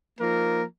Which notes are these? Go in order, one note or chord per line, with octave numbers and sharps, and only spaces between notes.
F3 A#3 D#4 A#4